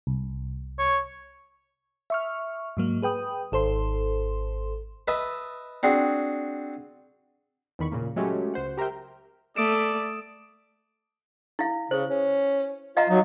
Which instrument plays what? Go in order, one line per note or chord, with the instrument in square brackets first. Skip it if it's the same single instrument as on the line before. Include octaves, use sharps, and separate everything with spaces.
[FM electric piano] C2
[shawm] C#5
[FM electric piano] E5 C#6 F6
G#2 F#3 A#3
G#4 B4 G5 D#6
G#1 A4 C5 C6
[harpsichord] B4 D#5 E5 A5
C4 D4 F#4 G#4
[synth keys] E2 D#3 B5 C#6
A#2 C#3 A#3
F#3 G#3 A3 C#4 F#4 G4
C#2 C5 F#5
G4 A#4 C5 E5 G5
[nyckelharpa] A3 [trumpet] D5 [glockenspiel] D#6 D7 E7
[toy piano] E4 F5
[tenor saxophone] C#3 [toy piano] C5
[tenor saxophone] C#4
[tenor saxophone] F4 [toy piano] D#5 F5 A#5
[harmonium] F#3 [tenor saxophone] D#4